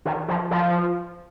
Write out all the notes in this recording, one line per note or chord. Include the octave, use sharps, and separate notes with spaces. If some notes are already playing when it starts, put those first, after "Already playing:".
D#3
F3
F3